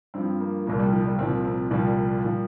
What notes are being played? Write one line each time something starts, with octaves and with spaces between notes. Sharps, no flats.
G2 F3 C4
A#3
C2 A#2 F3 A#3
G3
F3
G3
C2 A#2 F3 C4
C4
C2 A#2 F3 G3
A#2 F3